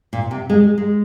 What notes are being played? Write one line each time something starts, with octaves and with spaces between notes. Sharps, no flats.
A#2
C3
G#3
G#3